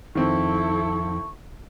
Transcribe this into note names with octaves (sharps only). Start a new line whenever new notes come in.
F2 D#3 C4 E4 A4 C#6